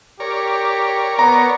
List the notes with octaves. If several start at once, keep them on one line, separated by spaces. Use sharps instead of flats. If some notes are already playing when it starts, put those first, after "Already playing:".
G4 A#4 C#5 D5
B3 A#5